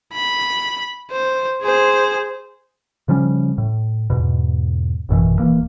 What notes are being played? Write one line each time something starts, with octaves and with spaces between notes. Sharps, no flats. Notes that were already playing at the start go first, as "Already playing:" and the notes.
B5
C5
G#4 C5
C#3 F3 G3 C#4
A2
E2 G#2 B2
A1 F#2 B2 E3
D#1 E3 A#3